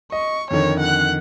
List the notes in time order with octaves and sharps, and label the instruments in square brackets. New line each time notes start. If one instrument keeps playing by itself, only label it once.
[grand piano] D#5 [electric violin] C#6
[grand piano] F2 D3 D#3 [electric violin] C#5
[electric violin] F#5 F#6